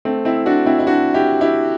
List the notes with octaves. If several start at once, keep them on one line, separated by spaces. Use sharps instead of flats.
A3 C4
C4 E4
D4 F#4
C4 E4
E4
D4 F#4
E4 G4
E4 G4